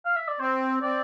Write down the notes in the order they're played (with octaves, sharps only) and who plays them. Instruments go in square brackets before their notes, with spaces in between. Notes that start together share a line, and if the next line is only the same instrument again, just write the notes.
[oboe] F5
E5
D5
[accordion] C4 [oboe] C5
[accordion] C4 [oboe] D5